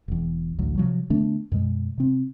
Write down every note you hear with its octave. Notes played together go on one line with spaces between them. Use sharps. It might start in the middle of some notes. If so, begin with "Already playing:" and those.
E1 E2
A1 D2 F#3
C3 F3 F#3
D3 A3 B3 D4
F#2 B2 G#3
C3 C4